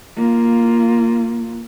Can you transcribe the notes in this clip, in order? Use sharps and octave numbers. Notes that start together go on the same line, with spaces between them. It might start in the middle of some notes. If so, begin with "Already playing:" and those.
A#3 F4